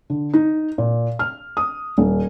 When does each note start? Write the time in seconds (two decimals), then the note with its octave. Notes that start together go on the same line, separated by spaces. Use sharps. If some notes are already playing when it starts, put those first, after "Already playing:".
0.10 D3
0.33 D#4
0.78 A#2
1.19 F6
1.57 D#6
1.98 D#1